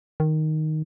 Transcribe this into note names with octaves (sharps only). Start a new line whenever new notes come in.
D#3